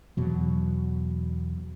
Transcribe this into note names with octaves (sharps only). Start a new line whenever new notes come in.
E2 B2 F#3